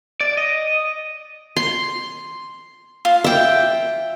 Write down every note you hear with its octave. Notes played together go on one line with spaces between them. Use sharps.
D5
D#5
C6
F4
E5 G5